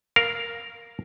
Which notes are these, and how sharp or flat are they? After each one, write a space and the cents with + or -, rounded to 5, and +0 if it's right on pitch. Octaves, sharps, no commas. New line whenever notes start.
A#4 +0 F5 +0